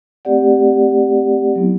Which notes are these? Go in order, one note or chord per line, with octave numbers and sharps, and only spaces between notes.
A3 C4 G4 D5 F#5
F#3 B3 E4